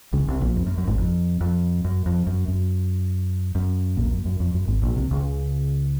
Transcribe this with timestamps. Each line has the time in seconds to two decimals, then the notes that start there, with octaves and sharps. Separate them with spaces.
0.13 C#2 C#3
0.28 C2 C3
0.41 A#1 A#2
0.56 F2
0.66 F#2
0.78 F#2
0.87 G#1 G#2
0.98 F2
1.41 F2
1.85 F#2
2.06 F2
2.27 F#2
2.48 F#2
3.55 F#2
3.97 A#1 A#2
4.06 F2
4.12 F#2
4.25 F#2
4.40 F2
4.54 F#2
4.67 G#1 G#2
4.82 A#1 A#2
4.96 C2 C3
5.11 C#2 C#3